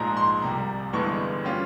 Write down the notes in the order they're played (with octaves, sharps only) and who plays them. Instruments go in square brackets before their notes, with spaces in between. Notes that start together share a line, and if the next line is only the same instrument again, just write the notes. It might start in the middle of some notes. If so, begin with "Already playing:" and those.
Already playing: [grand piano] A#1 G#2 F3 G#3 A#5
C6
C2 C3 G3 A#5
G1 G2 E3 G#3 C#6
G3 C#4 F4